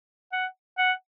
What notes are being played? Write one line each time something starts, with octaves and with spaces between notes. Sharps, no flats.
F#5
F#5